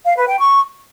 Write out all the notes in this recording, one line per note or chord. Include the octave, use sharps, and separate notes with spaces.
F5
B4
G5
C#6